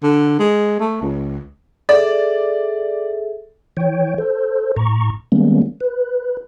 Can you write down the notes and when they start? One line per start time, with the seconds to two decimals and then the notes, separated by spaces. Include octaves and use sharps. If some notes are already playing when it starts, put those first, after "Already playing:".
0.03 D3
0.39 G#3
0.79 A3
1.01 C#2
1.89 G#4 A4 D5 E5
3.77 E3 C#5 G5
4.18 A4 C5
4.76 A2 A#5 C#6
5.32 D#3 G3 G#3 A#3 B3 C#4
5.81 B4